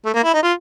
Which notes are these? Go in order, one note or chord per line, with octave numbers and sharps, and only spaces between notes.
A3
A#3
E4
D#4
F4